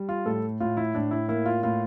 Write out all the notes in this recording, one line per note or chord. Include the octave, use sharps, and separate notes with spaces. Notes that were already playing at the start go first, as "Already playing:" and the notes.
Already playing: G3
F4
A2 A4
A2 F4
E4
A2 D4
E4
A#3 E4
F4
A2 F4